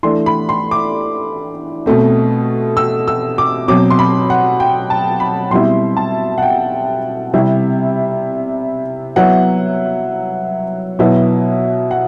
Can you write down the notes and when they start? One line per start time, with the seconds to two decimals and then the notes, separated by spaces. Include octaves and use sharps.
0.03 E3 A3 D4 C6
0.26 B5
0.49 C6
0.71 D6
1.86 B2 A3 C4
2.77 E6
3.08 E6
3.38 D6
3.68 B2 F#3 C4 D6
3.90 C6
3.99 B5
4.30 F#5
4.60 G5
4.90 A5
5.20 B5
5.51 B2 G3 C4 E4 C6
5.97 A5
6.38 F#5
6.42 G5
7.34 C3 G3 C4 E4
9.16 F#3 B3 E4 F#5
10.99 B2 F#3 B3 E4
11.91 F#5